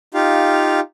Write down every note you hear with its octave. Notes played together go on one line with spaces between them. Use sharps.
D#4 F4 G4 F5